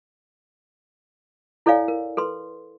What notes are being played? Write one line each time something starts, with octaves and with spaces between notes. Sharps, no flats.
E4 A4 C#5 D5 F5 G#5
A#4
A4 B4 C6